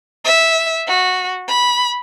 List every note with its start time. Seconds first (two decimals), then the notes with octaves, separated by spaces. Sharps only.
0.25 E5
0.88 F#4
1.48 B5